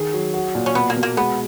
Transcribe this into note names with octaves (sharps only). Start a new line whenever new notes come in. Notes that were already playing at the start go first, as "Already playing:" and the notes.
Already playing: D#3 G#4
F#3
F#4
A#2
C#4
B2 B3
A#3
B2
A#3
G#3 B3